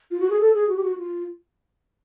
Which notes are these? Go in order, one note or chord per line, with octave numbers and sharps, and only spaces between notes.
F4
F#4
G#4
A4
G#4
F#4
G4
F#4
F4